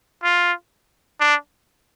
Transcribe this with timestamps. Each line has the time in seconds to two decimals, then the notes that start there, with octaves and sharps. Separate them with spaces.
0.23 F4
1.20 D4